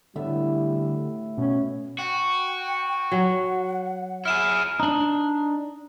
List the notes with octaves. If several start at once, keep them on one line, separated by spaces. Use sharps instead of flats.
A2 D3 G3 B3 E5
B2 C#4
F#4 G5
F#3 F#5
E4 G#4 F6 E7
D4 D#4